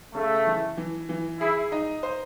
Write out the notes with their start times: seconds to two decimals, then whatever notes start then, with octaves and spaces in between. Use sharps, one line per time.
0.14 C#3 A3
0.47 E3
0.77 E3
1.09 E3
1.40 E4 G#4
1.72 D#4
2.03 C5